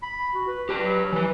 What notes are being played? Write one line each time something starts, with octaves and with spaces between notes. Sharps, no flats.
B5
F#4
B4
G4 B4
F#3
E3 B4